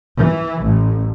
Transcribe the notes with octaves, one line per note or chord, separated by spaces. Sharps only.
E3
A1